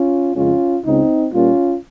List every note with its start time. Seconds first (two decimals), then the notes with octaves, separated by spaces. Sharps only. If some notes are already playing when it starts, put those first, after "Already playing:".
Already playing: C#4 F4
0.36 F2 C#3 G#3 C#4 F4
0.84 C#2 C#3 G#3 C4 D#4
1.33 A#2 G3 A#3 C#4 F4